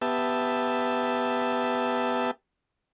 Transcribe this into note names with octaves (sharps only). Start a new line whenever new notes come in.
B3 G4 E5 A5